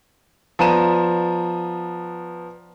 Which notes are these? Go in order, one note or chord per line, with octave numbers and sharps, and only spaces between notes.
F3 B3 D5 A#5 D#7 E7